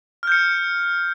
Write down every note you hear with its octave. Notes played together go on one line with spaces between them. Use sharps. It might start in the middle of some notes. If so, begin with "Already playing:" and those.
F6 G6 C#7